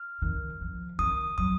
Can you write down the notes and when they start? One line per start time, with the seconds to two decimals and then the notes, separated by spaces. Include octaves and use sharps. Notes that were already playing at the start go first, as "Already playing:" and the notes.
Already playing: F6
0.22 D#3
0.61 F3
0.99 D#3 D#6
1.38 F#3 D#6